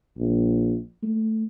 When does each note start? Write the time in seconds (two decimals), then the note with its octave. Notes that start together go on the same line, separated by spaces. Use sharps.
0.18 A#1
1.03 A3